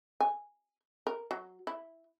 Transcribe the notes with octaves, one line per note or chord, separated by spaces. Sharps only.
G#5
A#4
F#3
E4